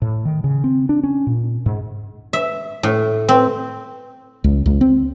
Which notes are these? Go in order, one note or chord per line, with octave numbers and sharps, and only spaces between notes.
A2
D#3
C#3
C4
D4
C#4
A#2
G#2
E5
A2
C4
C#2
C#2
C4